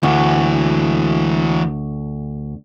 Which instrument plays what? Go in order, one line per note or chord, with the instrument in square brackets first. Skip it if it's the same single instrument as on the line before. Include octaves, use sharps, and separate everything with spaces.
[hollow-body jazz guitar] D2 [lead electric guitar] E3 F#4